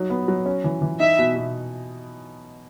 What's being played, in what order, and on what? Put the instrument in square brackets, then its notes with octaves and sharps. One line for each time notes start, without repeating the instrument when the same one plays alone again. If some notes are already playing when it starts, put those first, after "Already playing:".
Already playing: [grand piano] F#3 D#4
B3
F#3
C#4
E3
E3
[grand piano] D#4 [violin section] E5
[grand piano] B2
B2